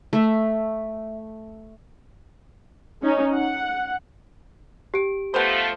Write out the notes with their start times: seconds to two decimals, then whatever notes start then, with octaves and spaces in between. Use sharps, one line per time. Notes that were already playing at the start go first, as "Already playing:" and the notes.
0.13 A3 E5
3.02 C#4 D#4
3.34 F#5
4.94 G4 D7
5.34 F3 A3 B3 C5